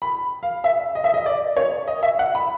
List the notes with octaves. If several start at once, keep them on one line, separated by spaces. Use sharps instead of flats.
B5
F5
E5
D#5
E5
D#5
D5
C#5
D#5
E5
F#5
B5